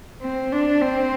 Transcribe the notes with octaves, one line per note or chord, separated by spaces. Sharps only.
C4
D4
C4